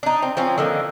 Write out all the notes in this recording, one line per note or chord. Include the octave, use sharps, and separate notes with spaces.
D4 D#4
C4
F3 C4 C#4
D3 D#3 A#3